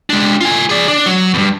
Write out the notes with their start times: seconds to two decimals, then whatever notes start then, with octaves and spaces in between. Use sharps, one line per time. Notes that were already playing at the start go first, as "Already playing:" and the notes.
0.10 G#3 D4
0.41 F4 G#5
0.69 G#4 D5
0.88 D4
1.06 F#3
1.34 E2 G2